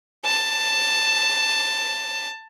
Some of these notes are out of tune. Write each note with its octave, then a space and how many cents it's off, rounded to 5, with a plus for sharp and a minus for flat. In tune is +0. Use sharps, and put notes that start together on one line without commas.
A5 +10